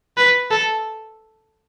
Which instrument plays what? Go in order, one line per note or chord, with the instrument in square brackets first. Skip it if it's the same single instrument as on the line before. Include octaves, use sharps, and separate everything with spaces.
[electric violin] B4
A4